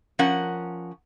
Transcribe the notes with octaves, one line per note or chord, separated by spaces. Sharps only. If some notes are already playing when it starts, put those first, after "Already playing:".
F3 C#4 A#4 F#5